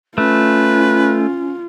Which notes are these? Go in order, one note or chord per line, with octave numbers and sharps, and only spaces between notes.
A3 C#4 F4 B4